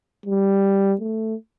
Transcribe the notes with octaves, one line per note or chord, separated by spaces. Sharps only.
G3
A3